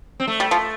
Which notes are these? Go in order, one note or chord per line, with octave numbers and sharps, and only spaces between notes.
C4
A3
G3
F3